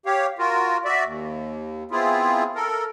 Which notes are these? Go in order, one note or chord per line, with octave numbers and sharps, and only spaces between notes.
G4 C#5 F5
F4 F#4 A#4
F#4 D5 E5
D#2
B3 C4 E4 F4 G#4
A4 A#4